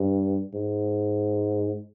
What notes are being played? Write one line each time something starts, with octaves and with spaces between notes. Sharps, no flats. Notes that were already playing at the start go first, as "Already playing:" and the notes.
Already playing: G2
G#2